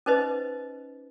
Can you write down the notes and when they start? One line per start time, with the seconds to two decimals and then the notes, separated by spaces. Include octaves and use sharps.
0.06 C#4 D#4 B4 C5 D#5